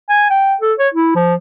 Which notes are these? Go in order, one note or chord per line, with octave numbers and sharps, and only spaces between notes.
G#5
G5
A4
C#5
E4
F3